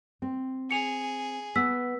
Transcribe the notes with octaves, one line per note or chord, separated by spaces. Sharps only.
C4
G#4 C#7 F7
B3 E6 B6